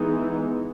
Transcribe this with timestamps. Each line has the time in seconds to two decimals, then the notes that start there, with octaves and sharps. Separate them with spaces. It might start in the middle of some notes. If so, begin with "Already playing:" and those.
Already playing: E3 G#3 B3 D#4